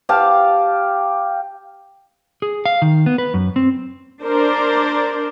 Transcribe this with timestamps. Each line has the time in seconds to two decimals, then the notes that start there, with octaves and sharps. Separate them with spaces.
0.09 G4 F5 A5
2.42 G#4
2.65 F5
2.82 D#3
3.06 B3
3.18 B4
3.34 F#2
3.56 C4
4.23 D4 A#4 C5 D5